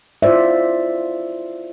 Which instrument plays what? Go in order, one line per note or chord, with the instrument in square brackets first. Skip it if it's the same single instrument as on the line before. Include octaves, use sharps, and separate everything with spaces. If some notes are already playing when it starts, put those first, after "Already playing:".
[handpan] E4 F4 C5 D5 E5